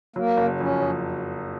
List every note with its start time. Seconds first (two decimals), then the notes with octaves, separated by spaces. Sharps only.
0.16 F#3 A#3
0.37 F#1
0.60 F2 C#4
0.82 F2